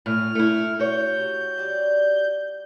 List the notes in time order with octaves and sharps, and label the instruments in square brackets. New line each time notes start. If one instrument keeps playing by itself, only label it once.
[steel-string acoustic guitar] A2 [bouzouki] G#5 [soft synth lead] F6
[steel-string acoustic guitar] A3 E4
[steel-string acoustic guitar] F#4 C#5 [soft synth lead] G6
[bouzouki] C3
G3 D5